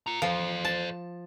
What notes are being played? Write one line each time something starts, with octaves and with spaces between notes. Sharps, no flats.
F4 A#5
F3 A4 C5
A5